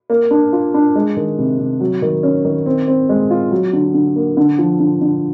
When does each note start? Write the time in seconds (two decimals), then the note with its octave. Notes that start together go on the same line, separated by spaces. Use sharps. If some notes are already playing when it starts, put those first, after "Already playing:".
0.10 A#3
0.31 D4
0.53 F4
0.74 D4
0.95 G#3
1.17 D#3
1.39 C3
1.59 C3
1.80 F#3
2.02 D#3
2.23 C#4
2.45 D#3
2.66 C4
2.88 C4
3.09 G#3
3.31 F4
3.52 F#3
3.73 D3
3.94 D3
4.16 A#3
4.37 D3
4.59 F3
4.80 D3
5.01 D3